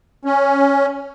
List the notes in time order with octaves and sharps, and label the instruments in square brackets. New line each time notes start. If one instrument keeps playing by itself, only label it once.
[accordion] C#4